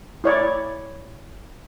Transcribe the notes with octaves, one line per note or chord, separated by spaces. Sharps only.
E4 C#5 D5